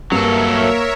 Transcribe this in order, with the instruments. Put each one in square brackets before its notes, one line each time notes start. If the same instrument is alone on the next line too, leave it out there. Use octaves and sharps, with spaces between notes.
[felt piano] G2 [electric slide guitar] F#3 A4 [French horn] A#3 [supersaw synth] A#4 C#5 E5